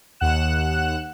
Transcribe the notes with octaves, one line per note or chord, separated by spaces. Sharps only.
D#2 F#5 F#6 E7